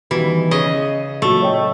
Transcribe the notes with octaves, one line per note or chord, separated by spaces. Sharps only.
B2 D#3 E3 G3
C#3 D#5 C#6
A#2 F#3 A3
C#5 D#5 G5